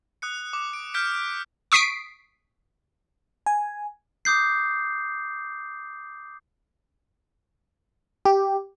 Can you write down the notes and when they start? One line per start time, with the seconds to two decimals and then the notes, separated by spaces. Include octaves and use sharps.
0.22 D#6 F#6 C#7
0.53 D6
0.73 D7
0.94 F6 G6 B6 D7
1.72 C#6 D#6 B6 C7 D7
3.46 G#5
4.25 D6 D#6 G6 C7
8.25 G4